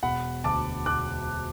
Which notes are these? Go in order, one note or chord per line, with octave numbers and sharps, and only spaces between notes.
E1 F#5 B5
D2 A5 D6
E1 D6 F#6